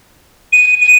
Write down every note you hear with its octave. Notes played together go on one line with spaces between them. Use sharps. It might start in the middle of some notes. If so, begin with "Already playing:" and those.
D#7
D#7